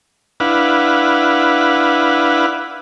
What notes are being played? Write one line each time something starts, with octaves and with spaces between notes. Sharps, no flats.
D4 E4 B4 F5 F#5